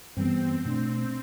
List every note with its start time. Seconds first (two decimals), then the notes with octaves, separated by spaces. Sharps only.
0.16 G2 E3 G3 B3 C4
0.65 B2 A3 D4